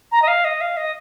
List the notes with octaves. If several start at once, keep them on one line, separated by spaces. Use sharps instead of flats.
A#5
D#5
F5
D#5
F5
D#5